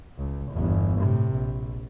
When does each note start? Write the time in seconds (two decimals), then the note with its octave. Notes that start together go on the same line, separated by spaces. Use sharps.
0.18 C#2
0.51 G1 E2
0.99 A2 C3
1.33 A#1